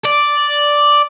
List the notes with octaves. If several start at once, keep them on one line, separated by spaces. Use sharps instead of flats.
D5